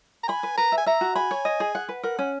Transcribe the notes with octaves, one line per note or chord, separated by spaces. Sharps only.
A#5
G#5 B5
B4
B4 A#5
E5
G#5
E5 A#5
F#4
G#5 B5
C#5
D#5
G#4
F#5
B4
A#4 F#5
C#4